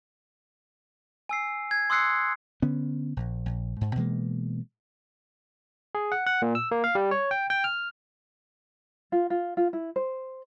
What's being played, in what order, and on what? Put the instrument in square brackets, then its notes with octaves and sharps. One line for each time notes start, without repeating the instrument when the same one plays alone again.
[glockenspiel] G#5 E6 C7
G#6
C6 D#6 E6 F#6 C7 C#7
[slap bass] D3 B3 C#4
A#1
A#1
G#2
B2 E3 G#3 A#3
[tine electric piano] G#4
F#5
F#5
A#2
E6
A#3
F5
G3
C#5
G5
G5
F6
[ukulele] F4
F4
F4
E4
C5